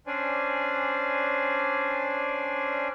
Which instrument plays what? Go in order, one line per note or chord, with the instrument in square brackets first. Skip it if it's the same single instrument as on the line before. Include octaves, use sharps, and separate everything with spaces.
[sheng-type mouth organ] C#4 D4 C5 D5 G#5